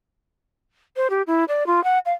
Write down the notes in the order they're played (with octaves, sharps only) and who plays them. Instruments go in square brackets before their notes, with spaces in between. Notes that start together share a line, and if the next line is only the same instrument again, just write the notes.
[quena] C5
G4
E4
D5
F4
F#5
F5